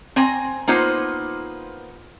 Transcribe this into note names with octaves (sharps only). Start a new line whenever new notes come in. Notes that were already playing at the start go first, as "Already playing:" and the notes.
C4 G#5 A#5
A#3 B3 D#4 F4 C5